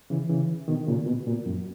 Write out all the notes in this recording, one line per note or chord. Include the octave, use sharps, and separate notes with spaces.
C#3 E3
C#3 E3
B2 D#3
A#2 C#3
B2
A#2
F#2